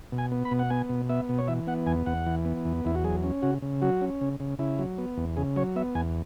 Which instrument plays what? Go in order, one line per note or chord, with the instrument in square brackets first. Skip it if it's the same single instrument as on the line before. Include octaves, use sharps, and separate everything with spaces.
[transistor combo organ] B2
G#5
B3
B5
B2
F#5
B3 G#5
B2
B3 E5
B2
C#5
E3 E5
B3 F#5
E2 G#5
E2 F#5
E3
B3
E2
E2 E4
F#4
F#3 G#4
C#4
C#3 F#4
C#3
F#3 F#4
C#4
C#3
C#3
C#3 E4
F#3
B3
E2
C#3 G#4
F#3 C#5
B3 E5
E2 G#5